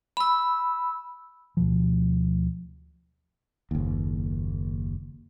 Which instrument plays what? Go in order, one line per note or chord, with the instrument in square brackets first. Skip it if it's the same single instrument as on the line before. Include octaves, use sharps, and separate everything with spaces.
[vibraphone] B5 E6
[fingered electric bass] D2 B2 F3
[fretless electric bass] F#1 D#2